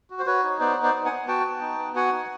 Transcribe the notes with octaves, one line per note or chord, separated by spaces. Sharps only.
F#4
C5
F#4 B4 C#5
D#4
B3 C5 D5
D#4
C5 D5
B3
F#5 G#5
B3
F#4 G5 A5
B3
D#4
B3
F#4 F#5 G#5
D#4